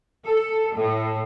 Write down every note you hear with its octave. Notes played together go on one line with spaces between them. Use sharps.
A4
A2